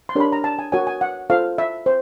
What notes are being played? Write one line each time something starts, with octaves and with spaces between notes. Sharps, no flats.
C6
D4 G4 A#4 C#5 B5
A#5
A5
G#5
F#4 A#4 C#5 G#5
G#5
F#5
F4 A4 C5 F5
E5
C5